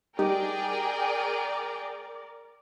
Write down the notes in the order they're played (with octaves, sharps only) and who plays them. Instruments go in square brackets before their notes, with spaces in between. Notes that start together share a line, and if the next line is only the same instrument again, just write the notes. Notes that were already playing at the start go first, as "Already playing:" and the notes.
[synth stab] G3 D#4 G4 [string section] G#4 G5 [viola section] A#4 D5